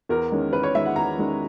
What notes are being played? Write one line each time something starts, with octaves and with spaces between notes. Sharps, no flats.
E2 A#4
D#3 G#3 C#4
E2 B4
C#5
D#3 G#3 C#4 E5
F#5
E2 A#5
D#3 G#3 C#4